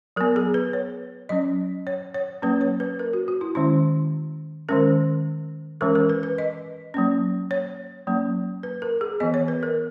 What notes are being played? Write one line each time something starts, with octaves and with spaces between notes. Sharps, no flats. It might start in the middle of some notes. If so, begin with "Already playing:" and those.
F#3 B3 A#4
G#4
B4
C#5
F#3 C#4 D#5
C#5
C#5
F#3 A#3 C#4 B4
C#5
B4
A#4
F#4
F#4
E4
D#3 G#3 C#4 E4
D#3 G#3 C#4 A#4
E3 G#3 C#4 A#4
A#4
B4
B4
D#5
F#3 A#3 C#4
C#5
F#3 A#3 C#4
B4
A#4
G#4
E3 B3 D#5
C#5
B4
A#4